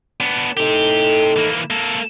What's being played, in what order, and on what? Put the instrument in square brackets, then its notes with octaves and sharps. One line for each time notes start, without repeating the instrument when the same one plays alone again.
[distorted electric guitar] B3 D4
[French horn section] A2 D#4 A4 [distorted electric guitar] C4 G4
[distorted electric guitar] E3 A#3
A#3 A4